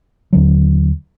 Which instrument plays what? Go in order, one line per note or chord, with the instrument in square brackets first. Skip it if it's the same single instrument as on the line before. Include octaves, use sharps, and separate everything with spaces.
[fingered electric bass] D#2 D3 F#3